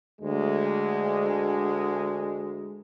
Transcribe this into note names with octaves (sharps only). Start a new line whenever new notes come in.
D2 G#3